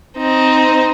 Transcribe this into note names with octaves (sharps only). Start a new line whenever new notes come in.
C4 D#4